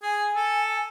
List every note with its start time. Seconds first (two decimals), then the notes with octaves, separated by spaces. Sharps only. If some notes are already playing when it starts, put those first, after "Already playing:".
0.02 G#4 G#5
0.36 A4